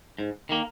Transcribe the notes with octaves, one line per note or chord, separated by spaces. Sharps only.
G#2
D#3 A#3